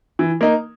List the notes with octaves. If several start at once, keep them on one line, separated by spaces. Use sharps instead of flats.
E3
A#3 D#4